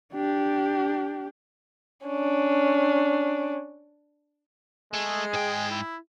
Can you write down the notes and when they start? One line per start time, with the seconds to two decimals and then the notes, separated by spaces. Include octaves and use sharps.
0.13 D4 G4
2.06 C#4 D4
4.93 G#3 A3 G#4
5.34 G#2 G5
5.71 E4